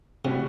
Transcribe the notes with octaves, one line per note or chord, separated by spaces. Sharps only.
A2 C3 G3 D4 F#4